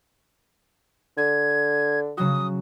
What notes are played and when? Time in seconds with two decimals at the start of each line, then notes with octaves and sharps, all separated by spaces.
1.18 D3 G#6
2.17 C#3 F#3 F#4 D#6